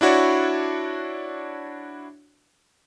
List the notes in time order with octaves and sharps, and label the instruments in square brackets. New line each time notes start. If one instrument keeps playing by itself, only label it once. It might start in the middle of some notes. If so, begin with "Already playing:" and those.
[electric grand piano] D4 E4 F#4 C#5 D5